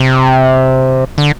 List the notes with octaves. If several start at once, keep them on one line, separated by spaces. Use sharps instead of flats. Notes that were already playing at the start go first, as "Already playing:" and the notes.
Already playing: C3
D3